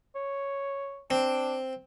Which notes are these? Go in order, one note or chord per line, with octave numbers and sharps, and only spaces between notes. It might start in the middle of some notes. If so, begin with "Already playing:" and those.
C#5
C4 D4